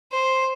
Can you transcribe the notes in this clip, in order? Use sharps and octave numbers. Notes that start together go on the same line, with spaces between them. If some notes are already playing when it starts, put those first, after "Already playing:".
C5